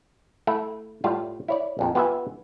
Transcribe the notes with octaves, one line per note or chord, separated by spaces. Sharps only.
A3 E4
A2 G3 A3 F4
E4 C#5 D5
A#1 F2 A#2
B3 F4 G4 B4 E5 G#5